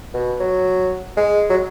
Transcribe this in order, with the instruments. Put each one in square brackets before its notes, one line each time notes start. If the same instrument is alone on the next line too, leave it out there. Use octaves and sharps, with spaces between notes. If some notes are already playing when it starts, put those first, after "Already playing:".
[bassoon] B2
F#3
G#3
F#3